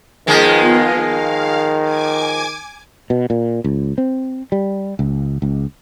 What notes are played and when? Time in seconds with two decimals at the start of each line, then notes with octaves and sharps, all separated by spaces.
0.27 D#3 F3 G#3 A#3 B3 F4
0.96 D#3 F5
1.80 G#5 D6 G#6
3.10 B2
3.30 A#2
3.64 C#2
3.98 C4
4.52 G3
4.99 C#2
5.42 C#2